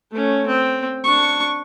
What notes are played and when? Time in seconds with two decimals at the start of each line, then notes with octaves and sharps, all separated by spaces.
0.12 A3 C#4
0.47 C4
1.04 D4 C#6